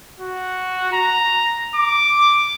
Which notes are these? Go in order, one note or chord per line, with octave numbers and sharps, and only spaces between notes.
F#4
A#5
D6